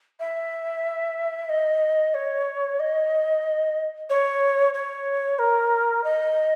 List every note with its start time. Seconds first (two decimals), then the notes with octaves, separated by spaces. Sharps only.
0.20 E5
1.49 D#5
2.14 C#5
2.80 D#5
4.10 C#5
4.74 C#5
5.39 A#4
6.04 D#5